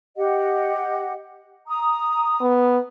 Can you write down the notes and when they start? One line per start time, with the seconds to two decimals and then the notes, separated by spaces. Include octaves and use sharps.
0.17 G4 D#5 F#5
1.68 A#5 D#6
2.41 B3